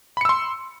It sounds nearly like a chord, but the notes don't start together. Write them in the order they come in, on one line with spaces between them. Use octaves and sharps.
B5 C#7 E6 C6